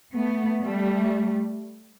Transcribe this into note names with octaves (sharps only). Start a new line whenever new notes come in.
A3 B3
G3 A3